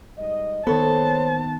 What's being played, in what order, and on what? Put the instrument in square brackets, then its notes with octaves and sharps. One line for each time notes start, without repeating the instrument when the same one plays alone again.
[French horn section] G#2 G3 D#5
[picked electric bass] D#3 B3 [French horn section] A#3 D#4 C5 [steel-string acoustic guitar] A4 C#5 [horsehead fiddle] A5